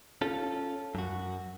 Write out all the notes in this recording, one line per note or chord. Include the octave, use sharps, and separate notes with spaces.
C#4 F4 A4
F#2 F#4